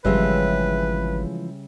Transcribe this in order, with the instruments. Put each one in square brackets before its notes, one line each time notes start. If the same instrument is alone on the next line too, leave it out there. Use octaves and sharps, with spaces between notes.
[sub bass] G#1 [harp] C#3 G3 E5 [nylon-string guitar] E3 F3 G#3 [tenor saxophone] B4